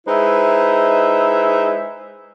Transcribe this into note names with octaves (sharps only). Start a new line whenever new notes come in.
G#3 D#4 E4 B4 C5 E5